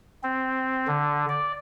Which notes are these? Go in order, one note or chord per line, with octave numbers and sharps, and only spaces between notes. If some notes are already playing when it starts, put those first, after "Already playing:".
C4
D3
D5